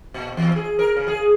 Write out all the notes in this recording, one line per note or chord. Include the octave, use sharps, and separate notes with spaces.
A#2
E2
G#4
A#4
C#3
G#4